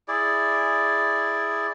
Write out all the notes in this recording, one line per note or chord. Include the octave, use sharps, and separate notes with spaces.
E4 G#4 D5